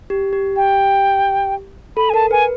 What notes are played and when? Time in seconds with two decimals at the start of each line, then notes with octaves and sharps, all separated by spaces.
0.10 G4
0.33 G4
0.56 G4 G5
1.97 A4 B5
2.10 G#5
2.14 A#4 A5
2.31 B4 G#5